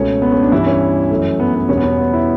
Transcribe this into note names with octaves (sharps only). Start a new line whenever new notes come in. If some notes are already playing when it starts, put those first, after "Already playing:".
Already playing: C#2 B2 A3 C#4
B3
C#4
D4
G2 E3 G3 E4
C#4
F#2 E3 A3
B3
B3
E2 B2 G3 C#4
B3
C#4
B3
E4